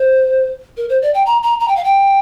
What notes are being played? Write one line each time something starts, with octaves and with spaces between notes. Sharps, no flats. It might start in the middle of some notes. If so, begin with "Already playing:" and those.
Already playing: C5
A#4
C5
D5
G5
A#5
A#5
A#5
G5
F5
G5